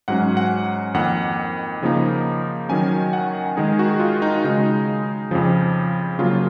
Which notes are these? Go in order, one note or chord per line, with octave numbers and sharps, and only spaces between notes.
G#2 F#3 C#4 F#5
F#5
F2 D#3 A#3 F#5
C#3 F3 A#3 D#4
D#3 F#3 C#4 G#5
F#5
D#3 G#3 D#4 G#4
F#4
F4
D#4
C#3 G#3 D#4
F2 C#3 F3
C#3 F#3 A#3 F4